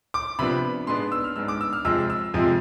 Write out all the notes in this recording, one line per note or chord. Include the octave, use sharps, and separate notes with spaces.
D6
C3 F3 B3 D4 B5
G#2 G#3 B3 D4 C6
E6
F6
G#2 G#3 B3 D4 E6
D6
E6
F6
F2 C3 F3 G#3 E6
E6
F2 C3 F3 G#3